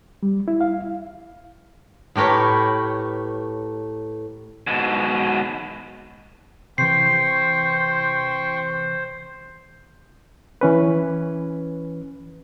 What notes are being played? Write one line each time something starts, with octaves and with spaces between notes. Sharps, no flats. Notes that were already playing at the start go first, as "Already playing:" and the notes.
G3
E4
F5
A2 G4 A#4 B4 C#5
G#2 B2
C3 E3 C5 G5 C6 C#6 C7
E3 C#4 B4